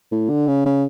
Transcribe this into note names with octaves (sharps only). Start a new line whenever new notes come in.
A2
D3
C#3
C#3